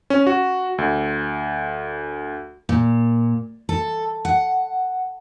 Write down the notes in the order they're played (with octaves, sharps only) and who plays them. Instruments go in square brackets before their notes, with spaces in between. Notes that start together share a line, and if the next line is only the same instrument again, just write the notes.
[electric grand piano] C#4
F#4
D2
[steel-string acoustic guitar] A#2
A4
F#5